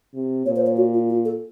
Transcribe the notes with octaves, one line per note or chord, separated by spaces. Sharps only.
C3
A#2 C#5
C5
C#5
F#4
F4
F4
A4